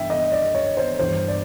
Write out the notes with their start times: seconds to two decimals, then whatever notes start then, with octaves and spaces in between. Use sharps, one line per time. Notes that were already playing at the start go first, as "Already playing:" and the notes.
Already playing: G2 E3 E5 G5
0.10 D#5
0.32 D5
0.55 C#5
0.77 C5
0.99 G2 E3 C5
1.28 D5